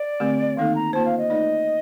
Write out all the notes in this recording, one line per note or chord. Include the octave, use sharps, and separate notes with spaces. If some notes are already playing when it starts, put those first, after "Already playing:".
Already playing: D5
D3 A3 C4 G4
D#3 A#3 D#4 A4 F5
A#5
A#3 F4 C5 A5
F5
D#5
A3 D#4 A4 D5